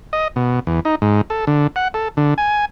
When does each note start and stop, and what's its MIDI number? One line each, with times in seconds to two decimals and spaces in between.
0.13 0.28 75
0.36 0.60 47
0.67 0.80 40
0.85 0.95 63
1.02 1.21 44
1.30 1.45 69
1.47 1.67 50
1.76 1.88 78
1.94 2.08 69
2.17 2.34 50
2.38 2.65 80